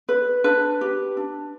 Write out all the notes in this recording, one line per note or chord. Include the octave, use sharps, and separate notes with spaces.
B4
D4 B4
G4 B4
D4